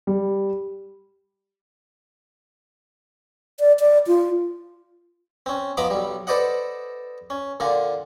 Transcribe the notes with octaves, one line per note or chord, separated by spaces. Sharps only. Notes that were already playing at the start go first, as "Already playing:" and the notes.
G3
D5
D5
F4
C4 C#4
F3 B3 D#5 A#5 B5 D6
B1 G3
A4 B4 C5 D5 D#5 F#5
C#4
A#2 D3 D4 F4